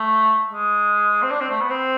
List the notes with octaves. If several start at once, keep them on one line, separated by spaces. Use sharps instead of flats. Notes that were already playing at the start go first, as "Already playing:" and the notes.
Already playing: A3
G#3
C4
D4
C4
A3
B3
C4